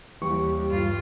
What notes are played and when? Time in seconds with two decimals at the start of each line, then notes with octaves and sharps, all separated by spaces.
0.22 D#2 E3 G3 C#6
0.69 G2 F4